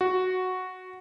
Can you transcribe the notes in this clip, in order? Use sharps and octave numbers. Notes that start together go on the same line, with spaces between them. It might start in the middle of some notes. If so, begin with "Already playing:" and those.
F#4